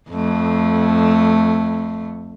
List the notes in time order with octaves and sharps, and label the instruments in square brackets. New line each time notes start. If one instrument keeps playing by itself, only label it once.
[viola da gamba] F2 A3